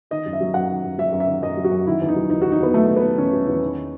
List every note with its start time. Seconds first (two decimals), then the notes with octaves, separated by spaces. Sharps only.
0.11 D#3 D#5
0.26 F#2
0.33 E5
0.41 F#3
0.54 F#2 F#5
0.69 D#3
0.84 F#2
0.98 F#3 E5
1.13 F#2
1.20 E5
1.27 D#3
1.42 F#2 D#5
1.57 F#3
1.64 F#4
1.71 F#2
1.87 D#3 E4
2.01 E2
2.08 D#4
2.16 F#3
2.30 E2 D#4
2.42 D#3 F#4
2.52 D#4
2.60 E2 B3
2.74 F#3 A3
2.88 E2
2.97 B3
3.03 D#3
3.18 E2 C#4
3.33 F#3
3.47 E2
3.62 D#3